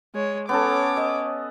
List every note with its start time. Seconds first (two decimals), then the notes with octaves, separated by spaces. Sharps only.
0.14 G#3 C#5
0.49 B3 C#4 A4 C#5 D6
0.97 D#5